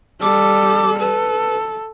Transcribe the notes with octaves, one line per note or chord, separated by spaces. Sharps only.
G3 A4 D6
A4 B4